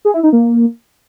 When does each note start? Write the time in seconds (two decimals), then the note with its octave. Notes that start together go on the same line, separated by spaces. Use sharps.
0.05 G#4
0.14 E4
0.23 D#4
0.33 A#3